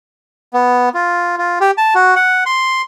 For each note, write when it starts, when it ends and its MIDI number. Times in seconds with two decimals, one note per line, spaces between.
0.53 0.89 59
0.94 1.36 65
1.38 1.59 65
1.61 1.71 67
1.78 1.94 81
1.95 2.15 66
2.16 2.44 78
2.46 2.82 84